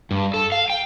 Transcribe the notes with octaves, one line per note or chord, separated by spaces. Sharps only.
G2
A4
F5
G5